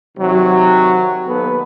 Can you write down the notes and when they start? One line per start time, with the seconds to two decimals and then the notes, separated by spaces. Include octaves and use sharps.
0.18 C3 D#3 F#3
1.27 D#2 B3 A4 B4